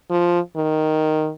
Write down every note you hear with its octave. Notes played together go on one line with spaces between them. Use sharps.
F3
D#3